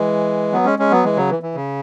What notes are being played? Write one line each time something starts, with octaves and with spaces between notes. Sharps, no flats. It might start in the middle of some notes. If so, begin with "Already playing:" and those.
Already playing: E3 G#3
F#3 B3
G#3 C#4
G#3 C#4
F#3 B3
E3 G#3
C#3 F#3
E3
E3
C#3